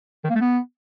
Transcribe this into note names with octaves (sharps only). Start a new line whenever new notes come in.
D#3
A#3
A3
B3